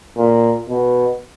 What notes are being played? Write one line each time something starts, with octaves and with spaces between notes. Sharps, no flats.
A#2
B2